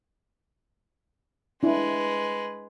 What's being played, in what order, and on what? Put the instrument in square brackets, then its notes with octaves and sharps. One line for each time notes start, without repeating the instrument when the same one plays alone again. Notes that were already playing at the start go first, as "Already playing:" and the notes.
[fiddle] G#3 B4 [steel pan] D4 E4